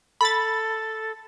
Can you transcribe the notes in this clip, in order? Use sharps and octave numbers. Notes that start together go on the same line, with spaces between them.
A4 B5 A6